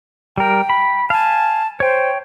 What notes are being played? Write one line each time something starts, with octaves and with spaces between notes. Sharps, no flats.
G3 A#4 G5
B5
F5 G#5 A5
C5 C#5 G5